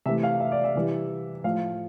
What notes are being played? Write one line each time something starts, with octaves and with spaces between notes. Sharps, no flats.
C3 E3 A3 E5
F5
E5
D5
E5
C3 E3 G3
A2 F3 A3 F5